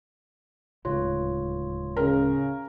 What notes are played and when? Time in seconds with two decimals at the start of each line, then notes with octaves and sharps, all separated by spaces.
0.85 D1 C#2 D#4 F4 C#5
1.97 C#3 A#4